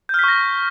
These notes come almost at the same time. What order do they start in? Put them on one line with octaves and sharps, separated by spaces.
G6 F6 B6 C#6 A#6